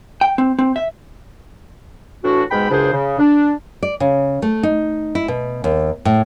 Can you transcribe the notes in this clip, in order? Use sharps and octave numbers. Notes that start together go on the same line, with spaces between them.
G5
C4
C4
E5
A2 E3 D4 F#4
G#2 B2 G#3 G5 B5
C#2 F#2 C#3 D4 G#4 C5
C#3
D4
D5
C#3
A3
D#4
E4
B2
D#2
A2